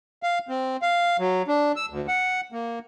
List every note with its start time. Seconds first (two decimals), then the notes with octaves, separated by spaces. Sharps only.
0.23 F5
0.49 C4
0.82 F5
1.19 F#3
1.48 D4
1.76 E6
1.90 D2
2.08 F#5
2.52 A#3